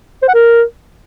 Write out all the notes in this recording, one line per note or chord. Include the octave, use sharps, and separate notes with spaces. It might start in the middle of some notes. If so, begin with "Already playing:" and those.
C5
F#5
A#4